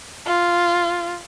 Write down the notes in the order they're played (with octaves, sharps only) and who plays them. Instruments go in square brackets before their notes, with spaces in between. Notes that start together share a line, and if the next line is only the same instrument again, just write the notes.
[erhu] F4